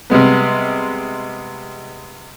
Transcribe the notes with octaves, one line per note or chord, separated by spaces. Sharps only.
C3 G3 G#3 B3